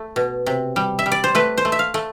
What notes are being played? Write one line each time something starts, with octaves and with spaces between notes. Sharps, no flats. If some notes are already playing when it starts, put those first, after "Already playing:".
Already playing: A3
B2
C3
G3
E5
G3
D5
C5
A3 B4
C5
A3
E5
F5
A3